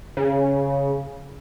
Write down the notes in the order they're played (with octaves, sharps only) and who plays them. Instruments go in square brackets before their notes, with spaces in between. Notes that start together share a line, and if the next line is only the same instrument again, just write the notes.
[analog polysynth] C#3